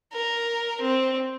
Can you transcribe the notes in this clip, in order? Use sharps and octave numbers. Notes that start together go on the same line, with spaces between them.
A#4
C4